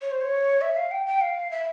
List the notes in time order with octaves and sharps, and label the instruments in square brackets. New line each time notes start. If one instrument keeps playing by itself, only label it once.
[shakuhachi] C#5
C5
C#5
E5
F5
G5
G5
F5
E5